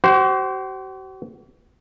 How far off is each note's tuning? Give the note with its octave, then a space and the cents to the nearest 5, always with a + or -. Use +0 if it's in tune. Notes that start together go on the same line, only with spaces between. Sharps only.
F#4 +45 C5 +0